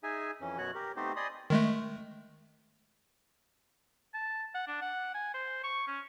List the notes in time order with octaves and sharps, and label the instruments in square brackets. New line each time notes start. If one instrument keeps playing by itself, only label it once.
[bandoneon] D#4 G#4 E5 G#5
F2 E3 C#4
F#2 B2 F#4 C#5 F#6
G4 A#4
A3 B3 C4 D#4 G4 C5
D5 D#5 G#5 B5 C6 D#6
[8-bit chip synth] D#3 G#3 A3
[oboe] A5
F#5
D4
F#5
G#5
C5
C#6
C#4